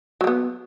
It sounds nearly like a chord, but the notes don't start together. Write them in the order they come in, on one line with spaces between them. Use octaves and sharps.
F#3 G3 B3